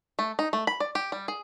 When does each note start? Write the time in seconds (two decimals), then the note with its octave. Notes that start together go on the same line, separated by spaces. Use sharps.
0.19 A3
0.39 D#4
0.53 A3
0.67 B5
0.80 D5
0.95 G4
1.12 G3
1.28 G#4